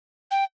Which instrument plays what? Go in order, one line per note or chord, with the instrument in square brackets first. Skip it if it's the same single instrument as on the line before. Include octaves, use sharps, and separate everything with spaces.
[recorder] G5